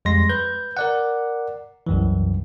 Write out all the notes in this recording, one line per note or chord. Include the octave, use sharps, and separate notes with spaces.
F2 G3 G#3 C6 A#6
B4 G6
A#4 D5 F#5
C2 F#2 E3